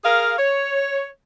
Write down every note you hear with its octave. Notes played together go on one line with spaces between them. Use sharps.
G#4 A#4 F5
C#5